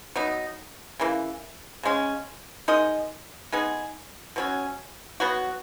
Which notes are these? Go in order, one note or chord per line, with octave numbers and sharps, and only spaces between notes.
F#3 B3 D#4
C#3 E3 A#3
C#3 G#3 C#4
G#3 D#4 A#4 D#5
G#3 B3 D#4 G#4
B2 F#3 C#4
B2 F#3 B3 F#4